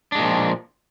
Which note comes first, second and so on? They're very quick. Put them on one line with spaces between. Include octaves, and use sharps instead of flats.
D4 G#3 A#2 F3